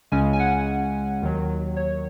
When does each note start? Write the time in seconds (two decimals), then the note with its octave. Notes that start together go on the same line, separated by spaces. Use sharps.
0.12 C#2 C#3 G#3 C#4 G#5
0.33 G#5
0.39 F#5
1.22 D#2 D#3 F#3
1.76 C#5